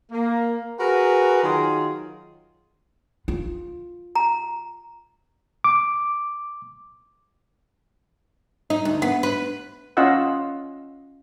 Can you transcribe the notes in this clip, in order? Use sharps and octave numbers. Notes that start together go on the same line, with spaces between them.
A#3
F#4 G#4 A#4 B4
D#3 F#3 F4 G#4
F4
A#5
D6
D#4
D2
B3
B4
C#4 F4 D#5 F5 F#5 E6